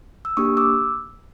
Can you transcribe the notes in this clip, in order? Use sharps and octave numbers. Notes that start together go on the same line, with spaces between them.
E6
A#3 D4 G4 C#6 D#6
D6 E6